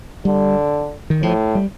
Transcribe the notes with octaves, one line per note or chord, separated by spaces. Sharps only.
D3 G3
D#3
A2 F3
G3